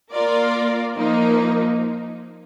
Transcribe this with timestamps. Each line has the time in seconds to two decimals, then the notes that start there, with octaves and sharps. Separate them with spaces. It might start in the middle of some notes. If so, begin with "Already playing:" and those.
0.13 A#3 F4 A#4 D5
0.97 F3 A#3 D#4